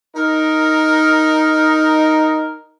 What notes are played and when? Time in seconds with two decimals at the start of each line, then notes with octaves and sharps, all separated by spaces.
0.16 D#4 A#4